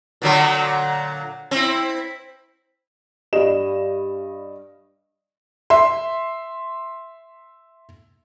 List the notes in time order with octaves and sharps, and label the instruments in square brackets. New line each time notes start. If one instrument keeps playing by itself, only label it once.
[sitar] A#2 D3 F#3
C4 E4
[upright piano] G2 G3 D#5 E7
[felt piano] E5 C6